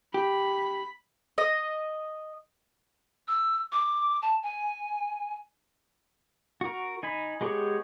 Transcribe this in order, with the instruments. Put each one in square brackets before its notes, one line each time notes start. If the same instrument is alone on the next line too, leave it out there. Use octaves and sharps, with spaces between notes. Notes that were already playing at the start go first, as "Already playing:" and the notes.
[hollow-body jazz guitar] G4 [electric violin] B5
[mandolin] D#5
[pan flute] E6
D6
A5
G#5
[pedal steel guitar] F#4 A#4
D#4 G#5 B5
G#3 B3 G4 G#4 C#5